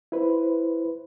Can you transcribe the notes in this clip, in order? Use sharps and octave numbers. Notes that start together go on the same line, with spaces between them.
E4 B4 C5